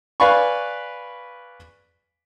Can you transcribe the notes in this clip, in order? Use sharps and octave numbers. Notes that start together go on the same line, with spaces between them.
B4 D5 F5 G#5 B5 C#6